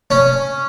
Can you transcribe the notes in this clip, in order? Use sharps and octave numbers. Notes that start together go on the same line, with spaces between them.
C#4